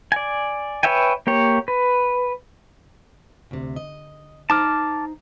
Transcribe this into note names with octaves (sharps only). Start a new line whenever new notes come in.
D5 G#5
B4 C#5 E5 G5 G#5
A#3 G4 C#5
B4
D2 C3
D#5
D#4 C5 A5 A#5 D6 F6